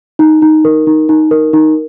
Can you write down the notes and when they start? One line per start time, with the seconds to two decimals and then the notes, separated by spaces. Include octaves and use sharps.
0.19 D#4
0.42 D#4
0.65 A#4
0.87 D#4
1.09 D#4
1.31 A#4
1.53 D#4